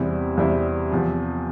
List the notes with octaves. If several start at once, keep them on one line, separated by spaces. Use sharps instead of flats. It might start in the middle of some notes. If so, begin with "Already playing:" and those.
Already playing: E2 C3 G3 C4 E4
E2 C3 G3 C4 E4
E2 C3 F3